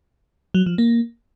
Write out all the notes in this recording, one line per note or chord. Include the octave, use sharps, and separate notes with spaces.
F#3
F3
A#3